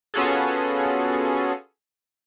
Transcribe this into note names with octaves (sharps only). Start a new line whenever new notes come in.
B3 C#4 F4 F#4 G#4 A4